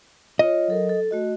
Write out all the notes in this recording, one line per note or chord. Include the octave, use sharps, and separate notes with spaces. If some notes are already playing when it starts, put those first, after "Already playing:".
F4 C#5 D#5
F#3 A4 A#4
A4
A3 F#4 D#5